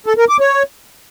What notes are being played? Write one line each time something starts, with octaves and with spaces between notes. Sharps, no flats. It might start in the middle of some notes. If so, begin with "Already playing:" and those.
A4
A#4
D6
C#5